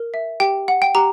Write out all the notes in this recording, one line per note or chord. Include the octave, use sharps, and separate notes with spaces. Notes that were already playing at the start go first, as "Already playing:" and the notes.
Already playing: A#4
E5
G4 G5
F#5
G5
G4 A#5